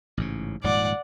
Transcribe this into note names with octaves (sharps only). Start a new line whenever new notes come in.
A1 G#2 C#3
D#1 G#2 F3 D5 F#5